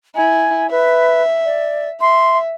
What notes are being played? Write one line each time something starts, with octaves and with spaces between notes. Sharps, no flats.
E4 G#5
B4 E5
D5
E5 C6